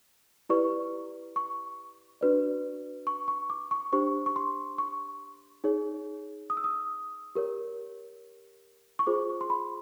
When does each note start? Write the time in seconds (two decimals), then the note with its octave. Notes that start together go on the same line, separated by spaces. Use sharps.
0.49 E4 G4 B4 D5 C#6
1.36 C#6
2.21 D4 F#4 B4 D5
3.07 C#6
3.28 C#6
3.50 D6
3.71 C#6
3.92 D4 G4 C5 C#6
4.26 C#6
4.36 C6
4.78 C#6
5.64 D#4 G#4 C#5
6.50 D#6
6.57 E6
6.64 D#6
7.35 G4 A#4 C#5
8.99 C#6
9.07 F4 G#4 C5 D6
9.41 C6
9.50 B5